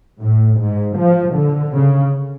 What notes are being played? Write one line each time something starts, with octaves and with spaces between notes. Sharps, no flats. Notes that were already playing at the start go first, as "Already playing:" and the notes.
A2
G#2
F3
D3
C#3